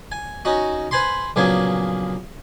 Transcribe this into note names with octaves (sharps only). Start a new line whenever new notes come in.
G#5
C#4 D#4 F#4
B4 C5 G#5 B5 C6
A#1 C#3 F#3 A#3 B3 G#5